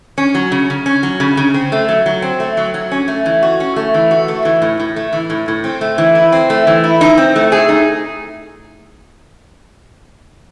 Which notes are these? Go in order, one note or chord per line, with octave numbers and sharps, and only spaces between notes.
C#4
F#3
C#3
C#3
C#4
F#3
C#3
C#3
C4
A3
F#3
F#3
C4
A3
F#3
F#3
C#4
A3
E3
F#4
C#4
A3
E3
F#4
A3
E3
A2
A2
A3
E3
A2
A2
C4
A3
E3
E4
C4
A3
E3
E4
D#4
C4
A3
G#4
D#4